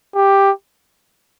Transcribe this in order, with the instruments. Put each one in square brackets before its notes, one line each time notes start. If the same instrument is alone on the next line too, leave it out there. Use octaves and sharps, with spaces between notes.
[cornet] G4